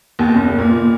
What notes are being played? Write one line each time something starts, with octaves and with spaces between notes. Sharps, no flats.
D#2
F#1
A#2